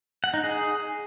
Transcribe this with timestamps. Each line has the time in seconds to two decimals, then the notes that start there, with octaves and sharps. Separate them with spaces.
0.24 F#5
0.34 D#4
0.44 G#4